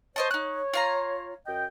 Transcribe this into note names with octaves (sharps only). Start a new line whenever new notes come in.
C5 C#5 D#5 A5
D#4 F#6
F4 F5 A#5
F#2 D#5 G5